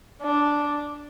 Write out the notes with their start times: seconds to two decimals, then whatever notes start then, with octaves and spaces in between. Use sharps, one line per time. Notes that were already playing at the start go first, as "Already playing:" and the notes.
0.23 D4